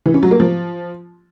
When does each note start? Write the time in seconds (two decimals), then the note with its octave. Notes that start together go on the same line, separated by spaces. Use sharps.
0.06 E3
0.14 C#4
0.23 F#3
0.31 A#3
0.40 F3